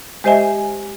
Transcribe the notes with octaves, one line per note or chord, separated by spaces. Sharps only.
G#3 G4 C5 D#5 E5 G#5